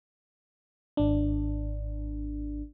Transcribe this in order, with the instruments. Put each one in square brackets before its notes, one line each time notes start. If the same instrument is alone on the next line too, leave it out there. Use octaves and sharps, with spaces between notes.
[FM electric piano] G#1 D4